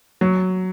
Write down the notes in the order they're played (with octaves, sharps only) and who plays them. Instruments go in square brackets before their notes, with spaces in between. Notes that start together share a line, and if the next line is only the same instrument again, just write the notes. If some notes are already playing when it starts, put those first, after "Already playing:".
[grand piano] F#3